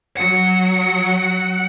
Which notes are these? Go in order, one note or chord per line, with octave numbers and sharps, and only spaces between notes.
F#3 F#5